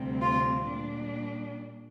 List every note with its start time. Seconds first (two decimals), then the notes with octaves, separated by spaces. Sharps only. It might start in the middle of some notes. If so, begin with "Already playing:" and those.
Already playing: D2 C3 G3 C4
0.22 F4
0.66 A#2 G3 D4